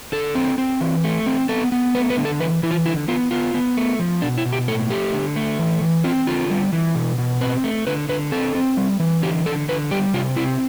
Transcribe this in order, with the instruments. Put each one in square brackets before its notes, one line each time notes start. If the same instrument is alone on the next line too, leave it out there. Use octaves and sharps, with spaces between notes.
[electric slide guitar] D3 A4
C4
C4
E3
A3
C4
B3 A4
B3
A3 B4
B4
D3
A4
E3 B4
E3 E4
F4
D3 E4
B3 F4
B3 F4
B3
A3
F3
B2 D4
E4
B2
G4
A2 A4
A3 G4
D3
A3
E3
E3
C4 F4
D3 F4
G3
E3
B2
B2
C4 B4
A3
D3 B4
D3 B4
C4 A4
C4
G3
E3
D3 G4
D3 A4
D3 B4
G3 G4
C3 F4
C4 E4